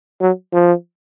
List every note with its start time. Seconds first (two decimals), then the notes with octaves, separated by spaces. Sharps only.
0.21 F#3
0.53 F3